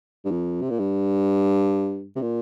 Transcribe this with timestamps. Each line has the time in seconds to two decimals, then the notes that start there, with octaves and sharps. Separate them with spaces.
0.25 G2
0.31 F2
0.62 C3
0.70 A#2
0.79 G2
2.16 C3
2.22 A#2